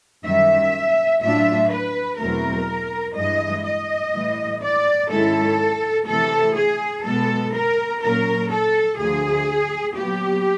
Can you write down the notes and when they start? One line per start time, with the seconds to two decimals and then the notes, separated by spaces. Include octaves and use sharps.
0.24 F#2 D#3 G3 E5
1.21 A2 F#3 A3 D4 F4 E5
1.71 B4
2.18 E2 B2 F#3 A3 C4 A#4
3.15 G2 E3 G#3 D#5
3.65 D#5
4.13 A2 E3 G3
4.62 D5
5.10 G#2 D#3 G#3 C#4 E4 A4
6.07 C3 E3 A3 A4
6.56 G#4
7.04 B2 G#3 B3 A4
7.54 A#4
8.01 A#2 F#3 A#3 C#4 A#4
8.50 A4
8.98 D2 D3 F3 G#4
9.96 A#2 F#3 B3 G4